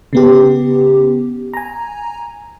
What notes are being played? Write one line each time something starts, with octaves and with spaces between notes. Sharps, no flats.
C#3 B3 G4
G#5 A#5